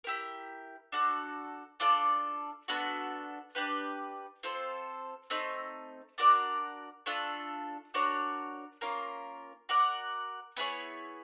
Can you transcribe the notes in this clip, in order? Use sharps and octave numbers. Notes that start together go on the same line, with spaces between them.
E4 G4 A#4
D4 F#4 A4
D4 F4 A4 D5
B3 D4 F#4 A4
D4 G4 B4
C4 F4 A4 C5
A3 C4 D#4
D4 F#4 A#4 D5
A3 D4 F4 A4
D4 F#4 A#4 C#5
A#3 C#4 F4 A#4
F#4 A#4 D5 F#5
B3 E4 G#4 C#5